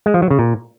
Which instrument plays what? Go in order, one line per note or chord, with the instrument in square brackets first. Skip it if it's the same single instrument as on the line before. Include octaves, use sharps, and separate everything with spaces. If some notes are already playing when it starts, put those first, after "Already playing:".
[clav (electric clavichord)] G#3
F3
F#3
C#3
A#2